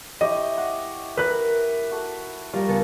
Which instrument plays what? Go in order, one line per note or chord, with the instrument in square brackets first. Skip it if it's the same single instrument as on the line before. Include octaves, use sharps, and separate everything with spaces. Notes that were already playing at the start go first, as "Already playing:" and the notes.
[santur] E4 G4 C#5 [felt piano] D#5
[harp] F#5 [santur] C#6
[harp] A#4 [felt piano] B4 F#6
[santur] F#4 A4 F#5
[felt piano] G3 [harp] F4 A#4 [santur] C#6
[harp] C#2 B3 A4